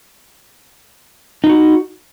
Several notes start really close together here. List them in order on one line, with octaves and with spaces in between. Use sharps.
D#4 F4 F#4